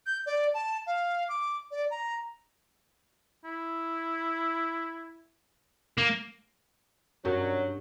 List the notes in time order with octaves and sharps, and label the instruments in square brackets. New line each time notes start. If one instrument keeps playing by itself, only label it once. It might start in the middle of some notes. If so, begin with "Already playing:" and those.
[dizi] G6
D5
A5
F5
D6
D5
A#5
[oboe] E4
[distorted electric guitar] A#3
[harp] G2 [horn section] F#3 [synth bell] C#4 G4 A#4